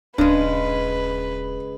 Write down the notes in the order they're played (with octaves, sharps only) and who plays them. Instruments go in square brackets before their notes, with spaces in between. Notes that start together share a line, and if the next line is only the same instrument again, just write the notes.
[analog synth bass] D#1 [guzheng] C#3 G#3 [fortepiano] D4 [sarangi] B4